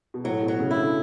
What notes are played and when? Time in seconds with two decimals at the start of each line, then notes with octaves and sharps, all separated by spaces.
0.14 B2
0.24 A2 F#3
0.42 B2
0.48 F#3
0.60 C#3
0.71 E4
0.76 D3